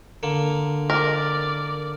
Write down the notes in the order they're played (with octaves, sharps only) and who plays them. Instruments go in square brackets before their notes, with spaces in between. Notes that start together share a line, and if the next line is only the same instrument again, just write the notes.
[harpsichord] D3 A#3
[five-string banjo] A#4 [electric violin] D5